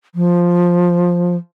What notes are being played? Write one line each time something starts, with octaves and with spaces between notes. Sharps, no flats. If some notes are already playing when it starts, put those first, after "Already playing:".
F3